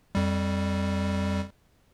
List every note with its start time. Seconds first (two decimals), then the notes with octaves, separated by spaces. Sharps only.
0.15 F2 G3